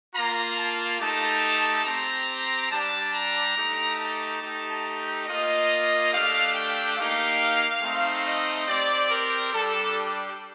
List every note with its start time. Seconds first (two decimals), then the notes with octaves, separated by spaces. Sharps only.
0.14 A#3 F4 A#5
0.57 A5
1.00 A3 D#4 G4 A5
1.85 C4 G4 A#5
2.70 G3 D4 G4 A5
3.13 A#5
3.56 A3 D#4 G4
3.99 A5
4.41 A3 D#4 G4
5.27 A#3 F4 D#5
6.12 A3 D4 G4 F5
6.55 G5
6.97 A#3 D#4 G4 F5
7.83 A3 C4 D#4
8.25 D#5
8.68 C4 G4 D5
9.10 A#4
9.53 G3 D4 G4 A4